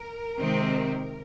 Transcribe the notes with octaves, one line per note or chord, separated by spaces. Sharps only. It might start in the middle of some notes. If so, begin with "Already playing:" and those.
Already playing: A#4
C3 D#3 G#3 C4